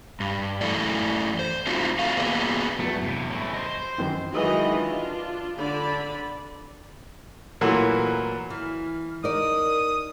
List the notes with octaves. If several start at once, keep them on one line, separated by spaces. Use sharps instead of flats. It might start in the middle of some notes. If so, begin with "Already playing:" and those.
G2
F#2 E3 A3 E4 A4 D5
C5
A3 C4 D4 D#4 F4 F#4
A3 F#4 F5
A#3 B3 D4 F#4 G#4 B4
E2 F#3 A3 B4
G2 C3
A2 E3
C5 D#5
C5
F#2 D#3 E3
D#3 E3 F#3 G#3 F#4 D#5
D4 F4
D3 D4 D5 B5
A#2 E3 F#3 A3 F#4 C6
E3 F6
D#4 A#4 D5 D#6